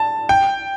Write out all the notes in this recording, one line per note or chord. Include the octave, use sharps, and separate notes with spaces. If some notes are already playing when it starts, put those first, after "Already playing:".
Already playing: A5
G5